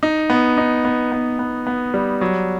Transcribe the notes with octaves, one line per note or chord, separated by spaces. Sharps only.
D#4
B3
D#4
B3
B3
B3
B3
G3
F#3